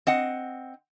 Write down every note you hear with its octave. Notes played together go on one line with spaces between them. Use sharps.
C4 D#5 F#5